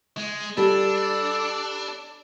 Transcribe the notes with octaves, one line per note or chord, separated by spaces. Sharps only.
G#3
G3 D4 A4